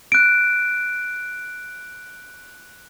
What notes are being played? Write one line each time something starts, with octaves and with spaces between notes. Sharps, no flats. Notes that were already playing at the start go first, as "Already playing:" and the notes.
F#6 D7